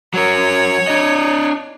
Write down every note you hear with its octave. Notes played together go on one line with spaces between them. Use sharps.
F#3 A#4 C#5
D4 D#5